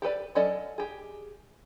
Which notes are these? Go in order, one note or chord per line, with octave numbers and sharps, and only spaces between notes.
G4 A4 B4 D5
F#3 C#4 A4 D5 D#5
G4 G#4